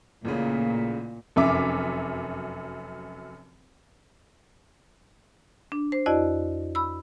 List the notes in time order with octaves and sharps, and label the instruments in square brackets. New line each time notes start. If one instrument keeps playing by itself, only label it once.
[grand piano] A1 C#3 [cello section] A#2
[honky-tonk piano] F1 F#2 E5 D6
[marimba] D4
C5
F2 E4 F#4 D5 D#5
B5 E6